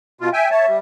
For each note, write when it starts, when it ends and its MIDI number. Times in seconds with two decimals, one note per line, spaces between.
0.21 0.29 47
0.21 0.29 65
0.33 0.49 76
0.33 0.49 79
0.33 0.49 80
0.51 0.66 73
0.51 0.77 76
0.51 0.66 81
0.68 0.79 55